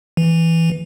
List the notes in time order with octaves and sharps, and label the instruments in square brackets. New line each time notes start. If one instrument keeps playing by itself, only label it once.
[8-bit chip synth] E3